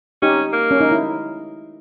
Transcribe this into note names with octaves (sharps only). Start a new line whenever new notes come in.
C#4 D#4 G4
A#3
C#4
D#4
E4